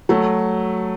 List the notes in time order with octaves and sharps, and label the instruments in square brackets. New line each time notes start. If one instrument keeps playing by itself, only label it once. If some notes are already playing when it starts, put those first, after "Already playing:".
[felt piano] F#3 A3